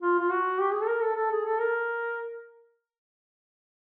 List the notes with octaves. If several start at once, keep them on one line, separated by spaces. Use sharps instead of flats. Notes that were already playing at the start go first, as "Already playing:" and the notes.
F4
F4
F#4
G4
G#4
A4
A#4
A4
A4
G#4
A4
A#4